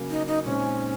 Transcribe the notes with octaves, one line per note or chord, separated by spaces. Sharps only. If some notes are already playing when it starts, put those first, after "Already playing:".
Already playing: C#3 F#3 A#3 C#4
D#4
D#4
A#2 G#3 C4 C#4 D#4